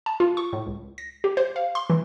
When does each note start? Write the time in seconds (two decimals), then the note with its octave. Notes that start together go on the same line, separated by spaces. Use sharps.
0.06 A5
0.20 F4
0.37 C#6
0.53 A2
0.67 C#2
0.98 A#6
1.24 G4
1.37 C5
1.56 F5
1.75 C6
1.90 E3